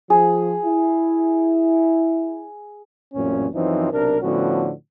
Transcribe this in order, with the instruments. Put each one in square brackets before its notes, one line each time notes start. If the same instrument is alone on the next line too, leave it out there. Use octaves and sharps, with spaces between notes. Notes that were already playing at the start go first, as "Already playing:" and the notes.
[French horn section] F3 [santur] G#4
[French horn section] E4
[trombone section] A1 F#2 A#2 C4 C#4
F#2 E3 F3 C4 C#4 D#4
B1 C3 D4 A#4
A2 D3 F3 B3 C#4 F#4